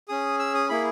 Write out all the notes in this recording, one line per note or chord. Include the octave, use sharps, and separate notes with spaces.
C#4 G#4 D#6
E6
D#6
A#3 E4 G#4 B5